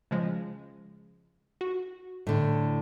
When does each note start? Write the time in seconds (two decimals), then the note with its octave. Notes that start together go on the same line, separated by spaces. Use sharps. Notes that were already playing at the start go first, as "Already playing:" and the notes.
0.11 C#3 F3 G#3
1.61 F#4
2.27 A2 D3